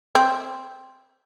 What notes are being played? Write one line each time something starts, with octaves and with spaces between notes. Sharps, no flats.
C4